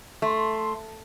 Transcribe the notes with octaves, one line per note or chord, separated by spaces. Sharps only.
A3 C6